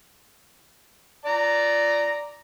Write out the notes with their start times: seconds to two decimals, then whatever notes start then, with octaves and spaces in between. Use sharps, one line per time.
1.26 D5 A#5